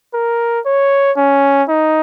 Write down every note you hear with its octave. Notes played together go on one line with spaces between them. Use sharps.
A#4
C#5
C#4
D#4